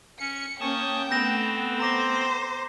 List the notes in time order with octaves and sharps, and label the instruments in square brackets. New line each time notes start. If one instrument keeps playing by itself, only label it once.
[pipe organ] C#4 [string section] C#7
[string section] A#3 C#4 [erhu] G5 [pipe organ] A5 C#6 D#6
[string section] A3 B3 [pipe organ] C4 [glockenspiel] G6 A#6 E7
[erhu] C5 [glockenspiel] A#5 D6 A#6